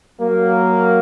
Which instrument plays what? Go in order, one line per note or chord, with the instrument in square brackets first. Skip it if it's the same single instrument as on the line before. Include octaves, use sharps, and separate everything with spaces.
[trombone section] F#3 A#3